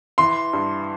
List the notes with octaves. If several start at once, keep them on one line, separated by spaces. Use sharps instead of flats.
E3 C6
G2